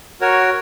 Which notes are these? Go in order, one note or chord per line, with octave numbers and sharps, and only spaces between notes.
F#4 A#4 C#5